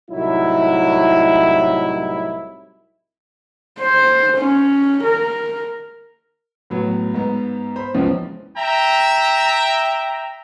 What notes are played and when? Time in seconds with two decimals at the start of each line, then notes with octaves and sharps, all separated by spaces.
0.11 C2 A2 F#3 D#4 E4
3.80 C5
4.37 C#4
5.03 A#4
6.70 A2 F#3 B3
7.14 G#2 B3
7.76 C5 B5
7.94 C#2 F#2 C#3 E3 F3 B3
8.57 E5 G5 A#5